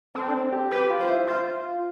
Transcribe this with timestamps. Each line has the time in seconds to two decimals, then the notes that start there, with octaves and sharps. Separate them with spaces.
0.15 C4 A4
0.29 D4
0.34 C4
0.52 G4
0.71 G4 B4
0.90 F4
1.00 C5
1.10 E4
1.27 F4 C5